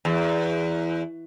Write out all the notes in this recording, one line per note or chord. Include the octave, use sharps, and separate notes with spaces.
E2